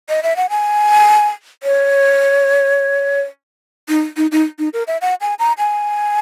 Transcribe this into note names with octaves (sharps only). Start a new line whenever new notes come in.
D#5
E5
F#5
G#5
C#5
D#4
D#4
D#4
D#4
A#4
E5
F#5
G#5
A#5
G#5